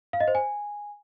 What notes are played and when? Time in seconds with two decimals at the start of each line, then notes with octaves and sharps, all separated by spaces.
0.13 F5
0.20 D#5
0.28 C5
0.35 G#5